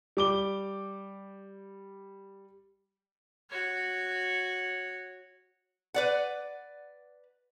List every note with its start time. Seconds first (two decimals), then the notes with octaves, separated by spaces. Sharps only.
0.17 G3 D6 G7
3.50 F#4 C#5
5.94 B4 D5 F#5